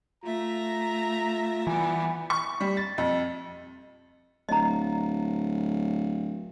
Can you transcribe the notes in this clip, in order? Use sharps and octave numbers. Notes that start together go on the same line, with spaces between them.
A3 F4 E5 A#5 A#6
E3 G3 B3
C#6
G3
A6
F2
D1 D#5 A#5